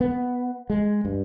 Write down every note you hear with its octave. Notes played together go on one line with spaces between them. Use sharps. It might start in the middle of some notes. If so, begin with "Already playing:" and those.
B3
G#3
G2